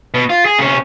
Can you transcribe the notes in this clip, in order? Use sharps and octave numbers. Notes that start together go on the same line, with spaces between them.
B2
F4
G#4
C3 C#4